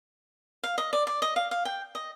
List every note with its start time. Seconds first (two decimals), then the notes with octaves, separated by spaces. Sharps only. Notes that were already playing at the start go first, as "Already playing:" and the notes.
0.63 F5
0.78 D#5
0.93 D5
1.07 D5
1.22 D#5
1.36 F5
1.51 F5
1.65 G5
1.95 D#5